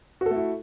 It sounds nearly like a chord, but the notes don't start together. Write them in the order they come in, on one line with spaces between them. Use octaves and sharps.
F#4 A4 A3 E4